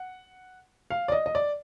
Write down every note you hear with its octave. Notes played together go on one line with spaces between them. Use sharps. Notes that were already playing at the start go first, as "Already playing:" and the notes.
Already playing: F#5
F5
D5
D#5
D#5
D5